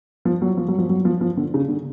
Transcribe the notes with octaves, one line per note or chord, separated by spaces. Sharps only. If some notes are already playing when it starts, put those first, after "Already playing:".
F3
F#3
F3
F#3
F3
F#3
F3
F3
D3
C#3
D3